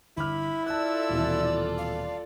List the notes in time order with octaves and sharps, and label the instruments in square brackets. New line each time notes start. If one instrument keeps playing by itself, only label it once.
[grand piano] G1 D6 F6 [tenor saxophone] E4 [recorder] B5
[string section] F4 A4 D5 [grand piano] A5 F#6 [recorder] E6
[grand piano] D#1 B2 E3
[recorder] F5